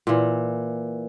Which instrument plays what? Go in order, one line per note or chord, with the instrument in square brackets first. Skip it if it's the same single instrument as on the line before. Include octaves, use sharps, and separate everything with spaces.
[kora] A#2 E3